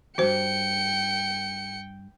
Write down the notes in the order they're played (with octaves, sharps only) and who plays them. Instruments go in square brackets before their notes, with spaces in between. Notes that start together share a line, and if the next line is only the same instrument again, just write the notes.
[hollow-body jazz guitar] E2 G2 [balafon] F#4 C5 [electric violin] G5 C#7